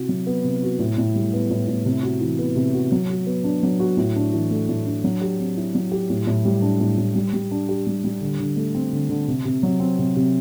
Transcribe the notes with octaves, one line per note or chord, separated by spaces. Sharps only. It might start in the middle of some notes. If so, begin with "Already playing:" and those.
Already playing: C3 E4 F#4
F#3
B3
C3
F#4
A2
A2
G3
B3
A2
A2
C3
F#4
E3
B3
C3
F#4
F#3
F#4
B3
D4
F#3
F#4
A2
D4
E3
A3
A2
D4
F#3
G4
C4
E4
F#3
G4
A2
A2
G3
D4
A2
A2
G3
G3
D4
G4
G3
G3
D3
D3
A3
C4
D3
D3
C3
C3
F#3
C4
C3
C3